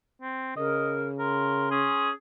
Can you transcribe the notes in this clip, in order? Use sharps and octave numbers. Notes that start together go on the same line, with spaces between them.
C4
C#3 A#4 D#5
A#4 C6
C#4 G#4